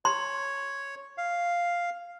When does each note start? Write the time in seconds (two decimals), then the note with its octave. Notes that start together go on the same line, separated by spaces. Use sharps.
0.05 C#5 C6
1.18 F5